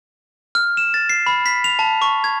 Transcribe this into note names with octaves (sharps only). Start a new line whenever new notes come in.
F6
E7
A6
C7
B5
B6
F7
A5
C#6
G#6